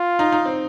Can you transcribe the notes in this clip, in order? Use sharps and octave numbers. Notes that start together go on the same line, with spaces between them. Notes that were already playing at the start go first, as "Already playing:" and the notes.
Already playing: F4
D#4
D#4
C4